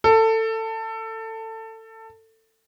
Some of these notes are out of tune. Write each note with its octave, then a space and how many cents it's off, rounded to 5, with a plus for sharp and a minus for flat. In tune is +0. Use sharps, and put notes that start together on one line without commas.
A4 +20